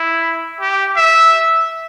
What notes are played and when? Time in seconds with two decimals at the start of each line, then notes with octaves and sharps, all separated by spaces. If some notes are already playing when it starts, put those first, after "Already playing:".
Already playing: E4
0.61 G4
0.96 E5